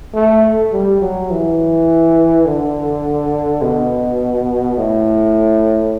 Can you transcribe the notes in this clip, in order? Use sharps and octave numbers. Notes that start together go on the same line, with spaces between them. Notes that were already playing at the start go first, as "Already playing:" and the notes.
A3
G3
F#3
E3
D3
B2
A2